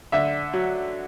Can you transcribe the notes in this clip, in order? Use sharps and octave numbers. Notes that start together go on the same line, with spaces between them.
D3 E5
F#3